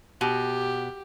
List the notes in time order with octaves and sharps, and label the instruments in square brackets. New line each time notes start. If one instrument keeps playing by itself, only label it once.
[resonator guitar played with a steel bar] B2 [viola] G4